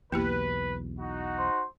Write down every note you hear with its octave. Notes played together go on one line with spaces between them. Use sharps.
B1 E2 A#3 E4 G4 B4
D#4 F#4
C5